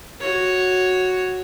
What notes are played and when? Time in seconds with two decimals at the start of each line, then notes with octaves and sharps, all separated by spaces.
0.20 F#4 C#5